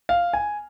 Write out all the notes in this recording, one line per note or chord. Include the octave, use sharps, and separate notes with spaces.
F5
G#5